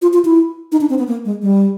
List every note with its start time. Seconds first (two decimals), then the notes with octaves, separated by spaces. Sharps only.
0.02 F4
0.13 F4
0.25 E4
0.72 D#4
0.81 D4
0.90 C4
0.98 B3
1.08 A#3
1.25 G#3
1.42 G3